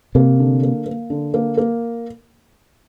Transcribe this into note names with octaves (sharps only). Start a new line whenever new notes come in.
C3 A#3
D3
A#3
A#3
D3
A#3
A#3